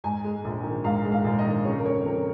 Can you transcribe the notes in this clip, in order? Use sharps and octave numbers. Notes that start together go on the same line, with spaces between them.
G#2 G#5
G#3
A#1
D#3
G#2 F5
G#3
F5
A#1
D#5
D#3
C#3 C#5
A#4
F2 C#5
F2 A#4